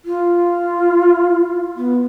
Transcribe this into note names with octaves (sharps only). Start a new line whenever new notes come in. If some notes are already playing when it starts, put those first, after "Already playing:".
F4
B3